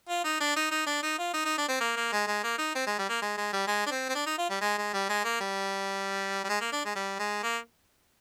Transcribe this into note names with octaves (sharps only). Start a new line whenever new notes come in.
F4
D#4
D4
D#4
D#4
D4
D#4
F4
D#4
D#4
D4
C4
A#3
A#3
G#3
G#3
A#3
D#4
C4
G#3
G3
A#3
G#3
G#3
G3
G#3
D4
C4
C4
D4
D#4
F4
G3
G#3
G#3
G3
G#3
A#3
G3
G3
G#3
A#3
D4
G#3
G3
G#3
A#3